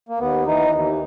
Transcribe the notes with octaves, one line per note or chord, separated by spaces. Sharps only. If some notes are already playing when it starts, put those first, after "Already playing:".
A#3
D#2 B3
E3 D#4
D#2